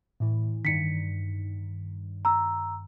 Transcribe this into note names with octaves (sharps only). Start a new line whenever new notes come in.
A2 E3
G2 D#3 B6 C#7
A#5 E6